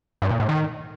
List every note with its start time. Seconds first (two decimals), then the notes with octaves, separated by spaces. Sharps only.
0.22 G2
0.31 A#2
0.40 A2
0.49 D#3